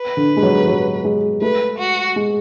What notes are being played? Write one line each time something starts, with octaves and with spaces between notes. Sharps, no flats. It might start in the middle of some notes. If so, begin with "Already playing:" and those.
Already playing: B4
D3
G#3
F#3
F#3
G#3
A3 B4
F#4
G#3